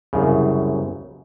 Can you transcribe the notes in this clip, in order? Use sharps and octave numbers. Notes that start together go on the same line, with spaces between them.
C2 F#2 C#3